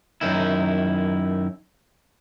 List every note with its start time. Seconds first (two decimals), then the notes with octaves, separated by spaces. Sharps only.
0.21 F#2 D#3 E4